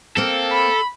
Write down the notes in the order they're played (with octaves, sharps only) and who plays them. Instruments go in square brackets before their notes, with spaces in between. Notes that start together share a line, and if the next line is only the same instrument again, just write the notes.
[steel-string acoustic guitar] A#3 C4 [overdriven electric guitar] A4
[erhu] B5